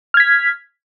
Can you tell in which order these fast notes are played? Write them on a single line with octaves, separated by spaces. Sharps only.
F6 G#6 B6